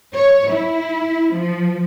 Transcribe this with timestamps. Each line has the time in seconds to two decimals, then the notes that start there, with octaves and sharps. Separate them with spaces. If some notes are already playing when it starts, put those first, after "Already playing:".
0.15 C#5
0.50 E4
1.32 F3